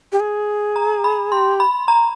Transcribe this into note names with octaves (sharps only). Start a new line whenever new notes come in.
G4
G#4
A#5
B5
G4 C6
B5
A#5